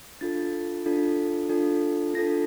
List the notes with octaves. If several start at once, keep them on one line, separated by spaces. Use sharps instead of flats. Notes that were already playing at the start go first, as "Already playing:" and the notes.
D4 F4 A4 A6
D4 F4 A4
D4 F4 A4
D4 F4 A4 A#6